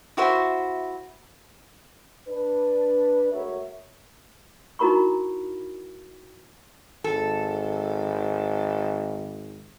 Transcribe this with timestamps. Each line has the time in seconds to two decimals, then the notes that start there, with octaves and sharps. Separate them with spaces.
0.17 E4 F#4 C5 E5
2.29 D4 B4
3.32 G#3 A3 F#4 A#4 C#5 E5
4.79 D#4 E4 F#4 A#4 B5 C#6
7.04 G#1 A4